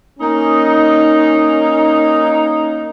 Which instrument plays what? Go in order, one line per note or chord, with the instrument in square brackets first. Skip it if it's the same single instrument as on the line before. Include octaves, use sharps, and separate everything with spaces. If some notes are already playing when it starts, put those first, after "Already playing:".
[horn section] A#3 C#4 D#4